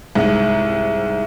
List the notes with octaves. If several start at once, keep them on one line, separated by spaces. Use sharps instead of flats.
C2 G#2